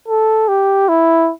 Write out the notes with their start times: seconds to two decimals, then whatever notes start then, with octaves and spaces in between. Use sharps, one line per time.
0.08 A4
0.48 G4
0.89 E4